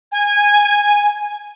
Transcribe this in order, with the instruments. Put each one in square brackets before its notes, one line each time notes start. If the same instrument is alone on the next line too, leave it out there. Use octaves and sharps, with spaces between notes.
[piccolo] G#5